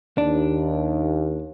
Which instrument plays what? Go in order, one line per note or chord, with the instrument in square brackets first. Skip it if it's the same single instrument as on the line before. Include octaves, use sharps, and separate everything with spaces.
[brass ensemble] D#2 [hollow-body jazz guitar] D4